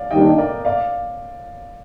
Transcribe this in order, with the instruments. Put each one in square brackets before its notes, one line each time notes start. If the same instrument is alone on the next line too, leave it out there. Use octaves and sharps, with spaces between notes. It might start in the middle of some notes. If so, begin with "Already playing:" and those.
Already playing: [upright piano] D5 F5
[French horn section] D#2 D#3 G3 D4 [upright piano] D#5 G5
[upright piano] A#4 D5
D5 F5